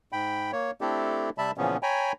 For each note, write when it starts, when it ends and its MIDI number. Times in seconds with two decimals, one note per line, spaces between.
0.12 0.51 44
0.12 0.51 79
0.12 0.51 83
0.52 0.71 58
0.52 0.71 73
0.81 1.30 57
0.81 1.30 60
0.81 1.30 62
0.81 1.30 64
0.81 1.30 67
0.81 1.30 69
1.38 1.51 48
1.38 1.51 55
1.38 1.51 76
1.38 1.51 81
1.38 1.51 83
1.58 1.77 46
1.58 1.77 49
1.58 1.77 52
1.58 1.77 53
1.58 1.77 59
1.58 1.77 61
1.83 2.12 73
1.83 2.12 79
1.83 2.12 80
1.83 2.12 82
1.83 2.12 83